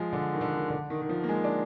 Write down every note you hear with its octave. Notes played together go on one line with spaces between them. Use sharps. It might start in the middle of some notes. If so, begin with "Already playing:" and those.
Already playing: F3 G#3
D3
D#3
D3
D#3
D3
D#3
D#3
F3
A#3
G#3
D4